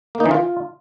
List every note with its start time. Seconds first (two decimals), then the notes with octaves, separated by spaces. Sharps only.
0.15 A#3
0.20 D#4
0.26 E3
0.31 F4